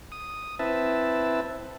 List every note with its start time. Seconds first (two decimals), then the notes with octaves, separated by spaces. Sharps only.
0.12 D#6
0.59 C4 E4 B4 E5 A5